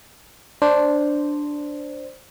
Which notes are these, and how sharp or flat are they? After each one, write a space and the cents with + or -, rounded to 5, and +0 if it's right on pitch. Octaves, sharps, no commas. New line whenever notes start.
D4 +0 C5 +0